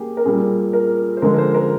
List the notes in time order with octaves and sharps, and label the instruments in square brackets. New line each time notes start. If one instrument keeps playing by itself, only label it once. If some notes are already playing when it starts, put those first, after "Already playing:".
Already playing: [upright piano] A#3 G4 G#4
A#4
A#2 G3 A#3 G#4
A#4
C5
D3 F3 G#3 A#4
A#4
C5
A#4